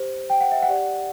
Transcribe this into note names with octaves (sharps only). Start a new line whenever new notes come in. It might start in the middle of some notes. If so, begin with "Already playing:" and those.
Already playing: G4 C5
G5
F#5
E5
F#5
G4 D5